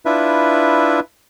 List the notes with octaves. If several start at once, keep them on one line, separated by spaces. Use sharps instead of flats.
D4 E4 F4 B4 E5